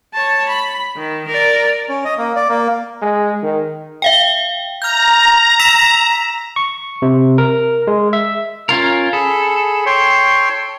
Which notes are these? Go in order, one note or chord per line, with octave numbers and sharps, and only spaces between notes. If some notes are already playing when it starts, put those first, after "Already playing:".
C#5 A5
B5
D#3
A#4 D5
C#4
D#5
A#3
D5
A#3
G#3
D#3
E5 F5 G5
A#5 F6 G6
E6 B6 E7
C#6
C3
A#4
G#3
E5
C#4 F4 A#4
G#4 A4 B5
C#5 G5 C6